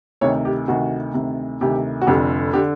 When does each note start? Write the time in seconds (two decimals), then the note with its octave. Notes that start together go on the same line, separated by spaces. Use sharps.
0.21 D2 C3 D#3 C#5
0.45 G4
0.68 D2 C3 D#3 F#4
1.14 D2 C3 D#3
1.61 D2 C3 D#3 G4
2.01 F#4
2.07 F1 F2 D3 G4
2.53 D3 G4